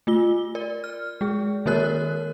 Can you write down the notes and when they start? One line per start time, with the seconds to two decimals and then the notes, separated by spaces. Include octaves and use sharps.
0.07 A3 F4 G7
0.55 A#4 D5
0.84 F6
1.21 G#3 G#4
1.66 D#3 A#3 F#4 A#4 C#5 F#6